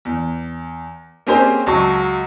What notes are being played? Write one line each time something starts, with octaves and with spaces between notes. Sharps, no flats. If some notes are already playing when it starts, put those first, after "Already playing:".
E2
A#3 C4 C#4 G4 G#4 C5
C#2 F#3 A5 C#6